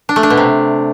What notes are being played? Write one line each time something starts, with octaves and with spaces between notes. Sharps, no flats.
D4
A3
D4
B2
C3